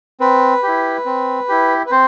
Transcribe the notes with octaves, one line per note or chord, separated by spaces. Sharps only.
C4 B4
E4 G4
C4
E4 G4
B4
C4 C5